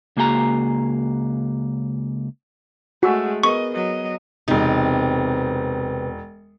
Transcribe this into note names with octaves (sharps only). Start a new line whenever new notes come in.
C#2 A#3 F#4 G#4 G5 A#5
G#3 A3 F#4 G#5 E6
B3 G#4 A#4 D#5 C#6
F#3 D#5
E1 C3 B3 C4 D#4